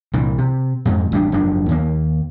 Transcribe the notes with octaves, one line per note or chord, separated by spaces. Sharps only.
C2 A#2 E3
C3
F2 G#2
A1 G3 B3 D4
F#1 G#2 F3 D4
D#2 A#3